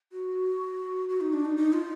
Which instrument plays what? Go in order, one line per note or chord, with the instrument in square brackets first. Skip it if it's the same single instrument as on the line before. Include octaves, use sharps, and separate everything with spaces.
[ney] F#4
F#4
D#4
D4
D#4
D#4
F4